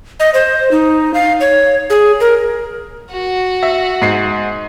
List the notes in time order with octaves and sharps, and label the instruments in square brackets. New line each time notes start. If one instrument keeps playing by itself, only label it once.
[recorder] D#5
C5
D#4
F5
C#5
G#4
A#4
[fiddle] F#4
[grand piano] E5
G#2 C7